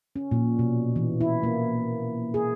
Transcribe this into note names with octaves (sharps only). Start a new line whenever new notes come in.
C#4
A#2
B2
E3
E4
A#3
G#4